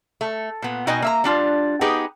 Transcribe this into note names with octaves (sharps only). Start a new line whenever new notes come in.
A3
A#2 B3
B2 D#4 B4 D#5 G5 G#5
A#3 E5 A#5
G3 D4 F4
B3 D#4 G4 G#4 B4 G5